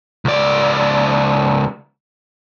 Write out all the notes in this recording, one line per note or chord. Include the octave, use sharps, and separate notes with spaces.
C#2 D5